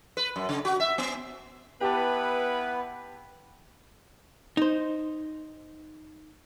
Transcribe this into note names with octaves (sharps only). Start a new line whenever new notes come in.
B4
F#2
C#3
F#4
E5
B3
B3 E4 G4 B4 A5
D#4 C5